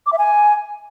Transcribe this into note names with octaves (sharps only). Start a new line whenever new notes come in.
D6
E5
G#5